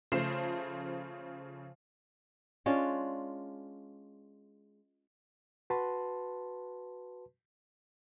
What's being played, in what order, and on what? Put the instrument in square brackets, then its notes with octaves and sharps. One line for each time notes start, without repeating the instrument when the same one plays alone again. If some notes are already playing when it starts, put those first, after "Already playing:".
[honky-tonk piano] C#3 F3 A3 C5 C7 E7
[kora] G#3 C#4 D4 F4
[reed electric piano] F#4 B4 A5 C6